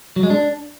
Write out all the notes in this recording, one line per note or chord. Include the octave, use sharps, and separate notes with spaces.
F#3
G#3
D4